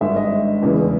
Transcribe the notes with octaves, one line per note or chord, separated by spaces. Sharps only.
G#1 G2 D3 E5
D#5
F1 E2 C#3 E3